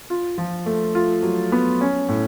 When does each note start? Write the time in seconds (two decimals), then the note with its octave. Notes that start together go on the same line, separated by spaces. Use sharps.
0.10 F4
0.38 F3
0.66 A3
0.95 F4
1.23 F#3
1.52 B3
1.81 C#4
2.09 A2